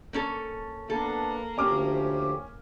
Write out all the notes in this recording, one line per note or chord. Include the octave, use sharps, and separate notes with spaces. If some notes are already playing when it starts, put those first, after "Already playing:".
A#3 C#4 A4
A#3 B3 D4 A4
D2 F3 C#4 G4 D6 F6